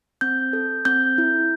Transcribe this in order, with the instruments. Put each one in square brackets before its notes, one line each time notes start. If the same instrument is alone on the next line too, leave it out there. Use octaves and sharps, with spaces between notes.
[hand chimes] C4 G6
A4
C4 G6
E4